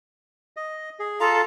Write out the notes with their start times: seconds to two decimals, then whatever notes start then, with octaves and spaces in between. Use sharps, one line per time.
0.57 D#5
0.99 G#4
1.20 F4 A4 F5 A#5